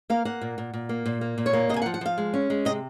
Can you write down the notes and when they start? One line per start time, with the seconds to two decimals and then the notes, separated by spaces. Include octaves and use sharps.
0.10 A#3 F5
0.25 A#3 F#5
0.41 A#2
0.58 A#2
0.74 A#2
0.89 A#3
1.06 A#2
1.21 A#3
1.38 A#2
1.46 C#5
1.53 A#3
1.69 C3 D#5
1.76 G#5
1.82 F#5
1.86 F3
1.94 F#5
2.01 F3 F5
2.18 G#3
2.34 C#4
2.50 G#3
2.65 C3 D#5